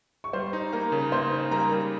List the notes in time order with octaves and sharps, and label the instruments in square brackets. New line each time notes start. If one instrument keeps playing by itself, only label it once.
[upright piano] C#6
[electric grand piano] G3 [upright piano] C5 C6
[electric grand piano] D#4
[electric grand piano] A#3 [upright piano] A#4 A#5
[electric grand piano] C#3
[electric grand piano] A#3 [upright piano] C5 C6
[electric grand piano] D#4
[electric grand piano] G3 [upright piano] A#4 A#5
[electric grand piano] G3